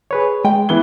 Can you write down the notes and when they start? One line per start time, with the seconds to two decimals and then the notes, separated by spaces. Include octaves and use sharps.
0.11 G#4 B4 C#5
0.45 G#3 G5
0.69 E3 B3 G7